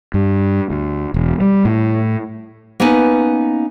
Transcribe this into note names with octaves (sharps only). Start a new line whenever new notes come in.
G2
D2
E1
G3
A2
A#3 B3 C#4 D#4 B4